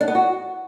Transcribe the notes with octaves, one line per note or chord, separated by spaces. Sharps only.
D4
B3
F#4